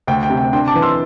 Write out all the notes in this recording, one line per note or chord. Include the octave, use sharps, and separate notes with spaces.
D2 G5
G5
C3
G5
D4 G5 C6
A5 D6
E3
C6 E6